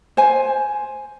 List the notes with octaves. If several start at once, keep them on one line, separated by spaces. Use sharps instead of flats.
C5 G#5